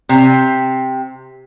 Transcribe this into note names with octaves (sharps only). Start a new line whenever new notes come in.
C3